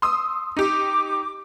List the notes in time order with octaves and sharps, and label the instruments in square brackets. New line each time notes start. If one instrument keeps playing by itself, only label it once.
[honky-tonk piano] C6 D#6 E6
[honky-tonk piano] D#4 G4 [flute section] D6